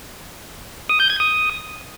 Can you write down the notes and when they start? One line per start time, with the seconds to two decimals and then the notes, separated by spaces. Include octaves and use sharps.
0.89 D#6
1.00 G6
1.10 G#6
1.20 D#6